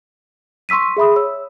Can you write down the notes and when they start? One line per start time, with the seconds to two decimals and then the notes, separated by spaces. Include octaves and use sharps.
0.69 C6 C#6 E6 B6 D#7
0.97 G#4 E5 B5 D#6
1.16 C#5 E6